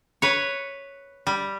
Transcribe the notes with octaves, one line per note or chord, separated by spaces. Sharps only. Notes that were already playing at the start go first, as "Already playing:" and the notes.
B4 C#5
G3